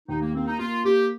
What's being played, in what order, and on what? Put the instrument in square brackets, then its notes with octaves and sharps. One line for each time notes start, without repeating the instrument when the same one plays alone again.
[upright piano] D#2 [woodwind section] D#4
[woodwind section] A#3
[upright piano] A#3 [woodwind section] C4
[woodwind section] D#4
[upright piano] A#3 [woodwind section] F4
[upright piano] A#3 [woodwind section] G4